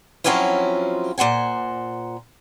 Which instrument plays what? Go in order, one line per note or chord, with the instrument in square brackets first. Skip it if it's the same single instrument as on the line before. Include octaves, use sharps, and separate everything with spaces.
[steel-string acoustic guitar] F3 F#3 C4 C#4 E4 F4
A#2 C5 F#5 G#5